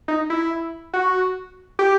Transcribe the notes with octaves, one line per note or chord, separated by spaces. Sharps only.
D#4
E4
F#4
G4